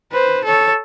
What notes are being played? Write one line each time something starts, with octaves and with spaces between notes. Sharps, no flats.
B4 C5
A4 C#5